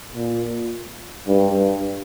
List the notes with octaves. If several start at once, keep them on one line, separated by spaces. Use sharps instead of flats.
A#2
G2
G2